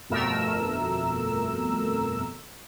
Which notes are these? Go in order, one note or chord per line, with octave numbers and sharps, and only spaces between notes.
G1 F2 B2 A3 A#4 E6